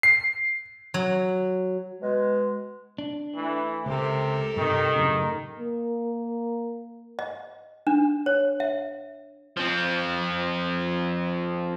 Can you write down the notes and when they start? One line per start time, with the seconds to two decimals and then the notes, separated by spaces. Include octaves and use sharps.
0.03 C7
0.94 F#3
2.02 B2 G#3
2.98 D4
3.35 E3 A3
3.86 C#2 C3 G4 A4 A#4
4.56 G2 C3 D#3
4.96 F#2 A2 C#3
5.59 A#3
7.19 D#5
7.87 D4
8.26 C#5
8.60 E5
9.57 F3 C4